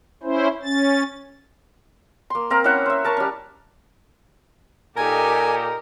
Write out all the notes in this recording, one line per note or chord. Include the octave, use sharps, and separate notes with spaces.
C#4 E4 C5
C#4 A6
A#3 C6
C4 A#4 F5 A#5
C#4 E4 E5 F#5
C5 E5
A#4 A5 C#6
G3 C#4
A#2 D#4 G4 A4 A#4 G#5